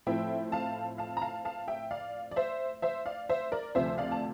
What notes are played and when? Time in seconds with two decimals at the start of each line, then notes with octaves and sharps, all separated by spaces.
0.07 A2 F3 C4 E4 E5 G5
0.52 F5 A5
0.98 F5 A5
1.17 A#5
1.22 F5 A5
1.45 F5 A5
1.68 E5 G5
1.91 D5 F5
2.31 D5
2.36 C5 E5
2.82 C5 E5
3.06 D5 F5
3.29 C5 E5
3.52 A#4 D5
3.75 D2 C3 F3 C5 E5
3.98 D5 F5
4.12 A5